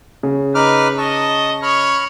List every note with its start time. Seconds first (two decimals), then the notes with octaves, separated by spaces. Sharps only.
0.23 C#3
0.55 D#4 B4 D6 F6
0.98 D#5 A5 C#6
1.62 C#5 B5 C#6 F6